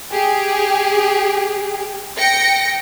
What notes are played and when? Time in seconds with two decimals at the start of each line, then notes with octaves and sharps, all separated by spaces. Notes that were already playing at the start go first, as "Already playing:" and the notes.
0.12 G4 G#4
2.19 G5 A#6 C#7